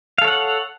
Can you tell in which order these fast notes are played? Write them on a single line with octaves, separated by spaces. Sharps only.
F5 A4 C#5 F#5